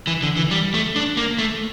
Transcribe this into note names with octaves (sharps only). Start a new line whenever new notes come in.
E3
D3
E3
G3
A3
D4
A#3
A3